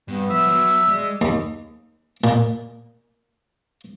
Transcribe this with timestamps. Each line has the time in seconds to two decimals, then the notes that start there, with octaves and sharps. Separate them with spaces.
0.08 G2 B3
0.30 F3 E5
0.47 F#3
0.88 G#3 D5
1.21 D#2
2.24 A#2